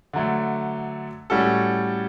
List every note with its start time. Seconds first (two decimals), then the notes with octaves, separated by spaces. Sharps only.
0.13 D3 F#3 A3
1.30 A2 G3 C#4 F#4 A4